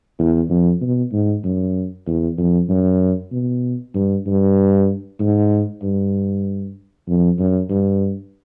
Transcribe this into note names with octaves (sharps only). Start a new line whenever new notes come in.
E2
F2
B2
G#2
F#2
E2
F2
F#2
B2
G2
G2
G#2
G2
F2
F#2
G2